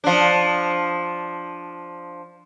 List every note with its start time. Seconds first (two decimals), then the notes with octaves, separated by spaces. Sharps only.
0.04 F3 D4